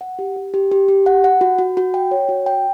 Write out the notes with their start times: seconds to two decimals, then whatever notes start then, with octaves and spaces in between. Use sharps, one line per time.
0.01 F#5
0.19 G4
0.36 G4
0.54 G4
0.71 G4
0.88 G4
1.06 F#5
1.24 F#5
1.41 F#4
1.58 F#4
1.77 F#4
1.94 G5
2.11 C#5
2.29 F#4
2.46 G5